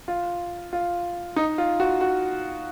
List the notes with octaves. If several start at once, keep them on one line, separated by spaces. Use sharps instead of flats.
F4
F4
D#4
F4
F#4
F#4